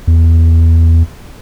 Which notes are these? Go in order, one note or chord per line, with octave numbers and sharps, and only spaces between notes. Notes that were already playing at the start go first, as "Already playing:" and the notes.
E2